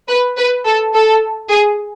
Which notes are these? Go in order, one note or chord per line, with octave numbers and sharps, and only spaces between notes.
B4
B4
A4
A4
G#4